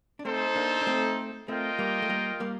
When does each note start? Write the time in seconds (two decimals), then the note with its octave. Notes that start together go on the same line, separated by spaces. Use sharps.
0.19 D4
0.25 A3 C4 D#4 A4 C5
0.55 A#3 D4
0.81 D4
0.87 A3 C4
1.48 A3 C4 F4 A#4 D#5 G5
1.79 G3 A#3
2.02 A3
2.09 G3 A#3
2.40 G3 A#3